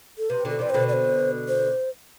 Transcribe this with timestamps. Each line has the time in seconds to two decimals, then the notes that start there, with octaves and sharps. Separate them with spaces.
0.18 A4
0.30 C3 B4
0.45 B2 D3 A4
0.59 C3 E3 D5
0.70 B2 D3 C5
0.89 D5
0.93 C5
1.48 C5